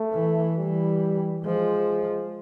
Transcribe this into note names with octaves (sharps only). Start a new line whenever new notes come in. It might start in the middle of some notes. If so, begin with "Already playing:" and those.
Already playing: A3
E3
E3 G3
F3 G#3